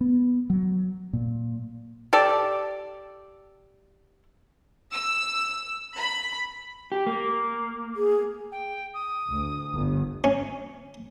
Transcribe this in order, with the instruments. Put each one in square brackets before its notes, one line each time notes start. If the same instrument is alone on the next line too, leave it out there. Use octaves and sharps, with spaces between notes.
[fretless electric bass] B3
F#3
A#2
[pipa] G4 A4 D5
[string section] E6
B5
[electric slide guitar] G4
A#3
[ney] G#4
[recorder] G5
D#6
[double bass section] D2
G1
[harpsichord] C#4